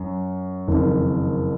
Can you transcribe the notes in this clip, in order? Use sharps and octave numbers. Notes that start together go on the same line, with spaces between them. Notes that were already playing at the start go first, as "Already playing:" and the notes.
Already playing: F#2
F#1 F2 D#3